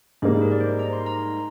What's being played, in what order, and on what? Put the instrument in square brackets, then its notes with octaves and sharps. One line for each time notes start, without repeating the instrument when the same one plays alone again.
[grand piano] G#2 G3 A#3 [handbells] G#4
[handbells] A#4
D5
C5
A#5
C6
A#5